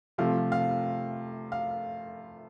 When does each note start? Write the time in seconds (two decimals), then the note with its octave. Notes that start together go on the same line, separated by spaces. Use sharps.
0.18 C3 F3 A3 F5
0.52 F5
1.52 F5